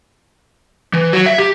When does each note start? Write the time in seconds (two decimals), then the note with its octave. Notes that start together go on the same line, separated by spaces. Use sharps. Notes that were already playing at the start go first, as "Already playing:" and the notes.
0.93 E3
1.13 F#3
1.26 E5
1.38 G4